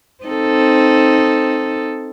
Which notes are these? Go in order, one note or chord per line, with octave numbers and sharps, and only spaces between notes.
C4 D#4 A4